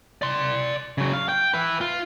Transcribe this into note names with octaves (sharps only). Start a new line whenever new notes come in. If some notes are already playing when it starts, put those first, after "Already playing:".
D5 C6
C#3 F#3
F5
G5
B4 E5
F4